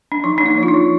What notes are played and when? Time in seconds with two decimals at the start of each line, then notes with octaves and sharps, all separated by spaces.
0.12 D4
0.24 F3 D#4
0.38 D4
0.41 A#3 D#4
0.58 F3 F4
0.68 D#4
0.74 F3